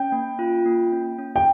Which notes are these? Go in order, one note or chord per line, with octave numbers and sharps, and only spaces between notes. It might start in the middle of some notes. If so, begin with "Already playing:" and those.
Already playing: C#4 G5
A#3
F4
A#3
C#4
C#4
G5